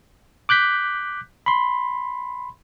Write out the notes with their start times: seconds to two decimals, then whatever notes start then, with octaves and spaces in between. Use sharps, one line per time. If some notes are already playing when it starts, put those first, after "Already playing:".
0.49 D6 F#6 G6 B6
1.46 B5 C6